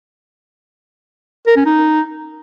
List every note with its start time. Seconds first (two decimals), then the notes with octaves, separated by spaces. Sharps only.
1.47 A#4
1.56 C#4
1.66 D#4